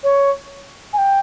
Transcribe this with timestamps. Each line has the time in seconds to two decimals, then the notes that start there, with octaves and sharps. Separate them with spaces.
0.03 C#5
0.93 G#5
0.98 G5